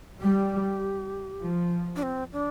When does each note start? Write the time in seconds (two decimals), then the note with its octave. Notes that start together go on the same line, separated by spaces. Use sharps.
0.21 G3 G4
1.41 F3
1.96 D4
2.03 C4
2.33 D4